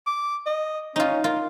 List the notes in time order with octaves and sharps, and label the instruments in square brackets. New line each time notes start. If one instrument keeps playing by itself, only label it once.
[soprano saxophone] D6
D#5
[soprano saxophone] C#4 [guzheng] D#4 F4
[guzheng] F4 [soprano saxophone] A#4